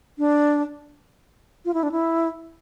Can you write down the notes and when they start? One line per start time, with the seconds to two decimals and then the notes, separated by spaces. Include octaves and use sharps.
0.18 D4
1.65 F4
1.74 E4
1.83 D4
1.92 E4